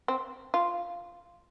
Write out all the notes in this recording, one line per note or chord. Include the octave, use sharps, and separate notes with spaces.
C4
F4